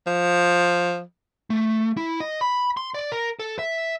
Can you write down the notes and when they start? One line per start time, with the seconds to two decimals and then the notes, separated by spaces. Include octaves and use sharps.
0.07 F3
1.50 A3
1.97 E4
2.20 D#5
2.41 B5
2.77 C6
2.94 D5
3.12 A#4
3.39 A4
3.59 E5